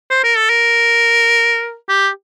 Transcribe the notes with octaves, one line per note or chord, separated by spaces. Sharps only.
C5
A#4
A4
A#4
G4